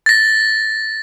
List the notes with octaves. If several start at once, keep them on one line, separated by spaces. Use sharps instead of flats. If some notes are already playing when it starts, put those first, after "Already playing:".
A6 A#6